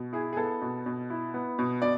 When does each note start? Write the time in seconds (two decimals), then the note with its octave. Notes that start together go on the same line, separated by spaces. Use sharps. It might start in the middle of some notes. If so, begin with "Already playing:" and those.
Already playing: B2
0.13 E4 G#4
0.33 G#4
0.37 B3 A4
0.62 B2
0.86 B2
1.10 E4
1.34 B3
1.59 B2
1.82 B2 D5